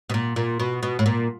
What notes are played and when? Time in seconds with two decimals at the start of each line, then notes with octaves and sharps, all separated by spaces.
0.09 B2
0.14 A#2
0.36 A#2
0.60 B2
0.83 B2
0.99 A2
1.06 A#2